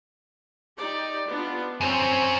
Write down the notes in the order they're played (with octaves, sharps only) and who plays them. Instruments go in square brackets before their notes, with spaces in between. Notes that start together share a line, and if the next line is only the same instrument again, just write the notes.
[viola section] D#4 G4 D5
B3 D4 F4
[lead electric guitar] F#2 C#4 [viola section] C4